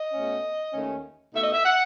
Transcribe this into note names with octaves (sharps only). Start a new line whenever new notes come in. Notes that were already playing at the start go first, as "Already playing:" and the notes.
Already playing: D#5
B2 A3 C#4
D#2 D#3 A3 C#4
B2 A3 D#4 E5
D#5
E5
F#5